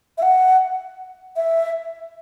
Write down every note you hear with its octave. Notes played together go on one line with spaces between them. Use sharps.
E5
F#5
E5